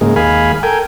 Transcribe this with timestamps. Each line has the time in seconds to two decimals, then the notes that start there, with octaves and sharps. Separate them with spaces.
0.01 G#2 C#3 G#3 A#3
0.16 D#2 G#3 F5 G#5 B5
0.63 A4 A#4 G5 G#5